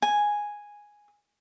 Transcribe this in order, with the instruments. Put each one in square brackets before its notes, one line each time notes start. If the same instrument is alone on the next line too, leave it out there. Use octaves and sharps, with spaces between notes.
[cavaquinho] G#5